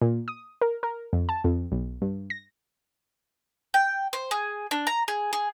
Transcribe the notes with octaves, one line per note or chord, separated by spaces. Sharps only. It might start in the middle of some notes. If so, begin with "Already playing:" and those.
A#2
D#6
A#4
A#4
F2
A5
F2
B1
G2
A#6
G5
C5
G#4
D4
A#5
G#4
G#4